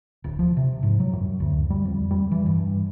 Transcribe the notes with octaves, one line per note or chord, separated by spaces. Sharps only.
D1
F3
C3
G#2
F#3
F#2
D2
G3
F2
G3
E3
G2